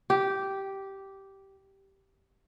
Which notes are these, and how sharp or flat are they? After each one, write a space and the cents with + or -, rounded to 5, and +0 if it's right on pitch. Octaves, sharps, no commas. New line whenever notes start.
G4 -10